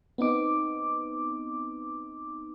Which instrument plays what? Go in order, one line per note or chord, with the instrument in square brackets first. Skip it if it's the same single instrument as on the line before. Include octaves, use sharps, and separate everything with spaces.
[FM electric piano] B3 C4 D#4 D6